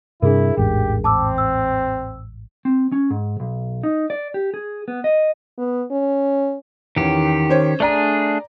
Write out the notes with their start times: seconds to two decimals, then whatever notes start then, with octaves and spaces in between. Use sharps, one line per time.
0.22 G2 C3 D4 E4 G#4 A#4
0.57 A1 E2 G#2 G4
1.04 C4 A5 D6 E6
1.38 E6
2.65 C4
2.92 C#4
3.10 G#2
3.40 B1
3.83 D#4
4.10 D5
4.34 G4
4.54 G#4
4.88 B3
5.04 D#5
5.58 B3
5.91 C#4
6.96 E2 D#3 C#4 G4
7.49 C#4 C5 C#5
7.80 A3 D4 G#4 D5 A#5